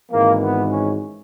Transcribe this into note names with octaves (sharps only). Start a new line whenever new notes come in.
G#1 G#2 E3 G#3 A#3
B3
C#4